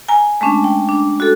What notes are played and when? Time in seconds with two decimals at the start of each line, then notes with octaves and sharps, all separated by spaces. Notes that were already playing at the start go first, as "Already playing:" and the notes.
0.08 G#5 A#5
0.41 G#3 A3 C#4 D4
0.64 G5
0.89 D4
1.20 F#4 A4